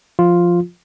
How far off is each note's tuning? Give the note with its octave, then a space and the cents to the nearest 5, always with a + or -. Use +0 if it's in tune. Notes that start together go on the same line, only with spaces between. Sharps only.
F3 +0 F4 +0